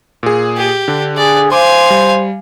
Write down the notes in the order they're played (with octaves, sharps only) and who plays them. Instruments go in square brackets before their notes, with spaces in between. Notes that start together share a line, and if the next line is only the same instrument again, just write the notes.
[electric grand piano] A#2 G#4
[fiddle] G4
[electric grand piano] D3 D4
[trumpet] G#4 [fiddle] D5
[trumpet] C5 [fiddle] F5 G#5 [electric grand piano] C6 D6
[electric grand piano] G3